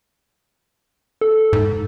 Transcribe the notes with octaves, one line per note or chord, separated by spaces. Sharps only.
A4
G#2